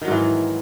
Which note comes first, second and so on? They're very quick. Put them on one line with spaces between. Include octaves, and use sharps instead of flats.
D#3 F#3 G#2 E3